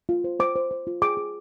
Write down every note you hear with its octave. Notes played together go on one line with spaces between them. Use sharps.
F4
C5
C5 D6
C5
C5
F4
G#4 D6
G#4